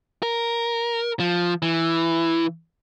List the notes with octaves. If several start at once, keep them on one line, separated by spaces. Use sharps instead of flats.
A#4
F3
E3